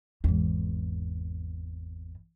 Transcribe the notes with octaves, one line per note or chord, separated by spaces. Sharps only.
G#1 E2